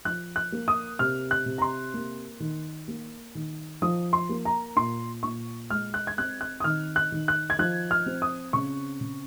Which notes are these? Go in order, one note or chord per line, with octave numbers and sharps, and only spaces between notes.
F3 F#6
F#6
A#3
D#6
C3 F6
F#6
C3
A#5
C6
A#3
D#3
A#3
D#3
F3 D#6
C6
A#3
A#5
A#2 C6
A#2 C#6
G#3 F6
F#6
G#6
C4 F#6
F#6
D#6
D#3 F6
F#6
D#3
F#6
G#6
F3 F#6
F6
C4
D#6
C#3 C#6
C#3